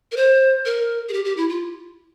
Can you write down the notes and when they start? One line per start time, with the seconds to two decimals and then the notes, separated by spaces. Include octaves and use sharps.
0.12 A#4
0.17 C5
0.65 A#4
1.09 G#4
1.13 G4
1.25 G4
1.37 E4
1.49 F4